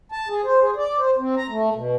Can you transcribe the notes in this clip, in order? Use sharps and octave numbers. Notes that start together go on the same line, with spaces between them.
A5
G#4
C5
G#4
D5
C5
C4
A#5
A3
B2